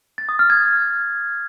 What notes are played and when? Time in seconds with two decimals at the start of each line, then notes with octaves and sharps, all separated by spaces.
0.18 A6
0.29 D#6
0.39 F6
0.50 G#6